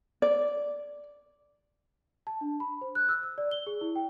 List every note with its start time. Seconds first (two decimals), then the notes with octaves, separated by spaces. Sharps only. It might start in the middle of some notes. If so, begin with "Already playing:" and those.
0.22 D5
2.27 A5
2.41 D4
2.60 B5
2.81 C5
2.95 F#6
3.09 E6
3.23 E6
3.38 D5
3.51 G7
3.67 G#4
3.81 E4
3.96 G5